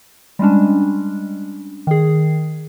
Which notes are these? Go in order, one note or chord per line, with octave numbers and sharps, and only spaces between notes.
G3 G#3 C#4 D4
D#3 G#4